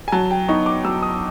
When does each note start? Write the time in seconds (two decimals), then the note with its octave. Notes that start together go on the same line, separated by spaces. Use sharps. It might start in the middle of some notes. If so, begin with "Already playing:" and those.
0.08 G#5
0.12 F#3 A5
0.31 G5
0.48 B3 D#4 C#6
0.66 D6
0.85 F#3 E6
1.03 D#6